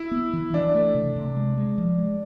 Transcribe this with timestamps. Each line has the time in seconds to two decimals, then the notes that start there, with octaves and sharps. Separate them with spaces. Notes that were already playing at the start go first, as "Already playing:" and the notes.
Already playing: E4
0.11 B3
0.33 E3
0.53 E3 D4
0.75 A3
0.94 C3
1.16 C3
1.37 G#3
1.58 G#3
1.78 F3
1.98 G#3